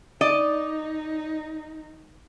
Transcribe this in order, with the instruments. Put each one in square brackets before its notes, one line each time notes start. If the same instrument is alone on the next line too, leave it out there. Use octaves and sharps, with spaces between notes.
[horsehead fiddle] D#4 [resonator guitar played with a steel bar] D5 D#5